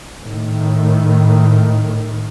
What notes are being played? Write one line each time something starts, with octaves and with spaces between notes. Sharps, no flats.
A2 D#3